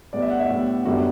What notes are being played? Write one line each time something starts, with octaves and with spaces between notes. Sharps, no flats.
A2 G3 B3 D5
E5
F#5
E5
A2 G3 B3
F#2 D3 G3 B3 F#4